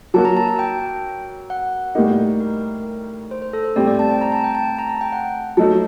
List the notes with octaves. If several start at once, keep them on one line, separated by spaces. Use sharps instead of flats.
F#3 A#3 F#4 A5
A#5
A5
A5
G5
F#5
A2 G3 A#3 D#4
A#4
C5
C5
A4
C5
A2 G3 C4 D5
D5
A5
G5
A#5
A5
G5
A5
A#5
A5
G5
F#5
F#3 A3 D#4 F#4 A5